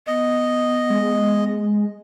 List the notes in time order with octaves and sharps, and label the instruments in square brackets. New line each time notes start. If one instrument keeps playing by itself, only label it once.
[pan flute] B3 [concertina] D#5
[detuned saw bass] G#3